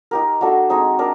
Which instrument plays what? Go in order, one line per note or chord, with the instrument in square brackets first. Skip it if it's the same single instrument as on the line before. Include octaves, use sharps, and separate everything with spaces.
[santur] D#4 G4 A#4
A3 D4 F#4
G#3 C4 D#4
D4 A#4